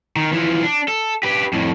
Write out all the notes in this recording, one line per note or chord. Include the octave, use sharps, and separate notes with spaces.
D#3
E3 F3
D4
A4
G4 B4
F2 A2